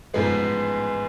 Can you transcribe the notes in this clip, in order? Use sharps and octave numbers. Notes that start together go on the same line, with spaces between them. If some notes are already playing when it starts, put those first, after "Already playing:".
A1 G#2 F3 G#3 B3